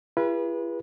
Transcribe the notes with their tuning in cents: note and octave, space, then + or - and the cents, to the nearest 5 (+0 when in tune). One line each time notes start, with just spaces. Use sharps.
E4 +45 G#4 -45 B4 -25